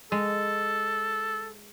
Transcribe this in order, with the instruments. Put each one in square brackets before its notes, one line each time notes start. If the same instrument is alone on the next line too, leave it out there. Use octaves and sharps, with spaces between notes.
[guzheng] G#3 [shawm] A4